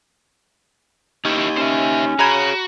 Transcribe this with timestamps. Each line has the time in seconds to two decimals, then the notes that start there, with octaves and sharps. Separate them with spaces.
1.25 C#4 D#4 E4 G4
1.57 C#4 C5 E5
2.19 F#4 G#4 C#5 A#5 B5 G#6